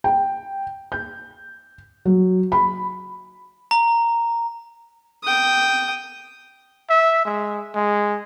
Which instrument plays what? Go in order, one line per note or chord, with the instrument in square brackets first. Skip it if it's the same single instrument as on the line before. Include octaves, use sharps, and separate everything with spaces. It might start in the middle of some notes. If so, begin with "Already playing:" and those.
[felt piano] G5
G6
F#3
B5
[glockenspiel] A#5
[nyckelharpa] G5 D#6
[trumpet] E5
G#3
G#3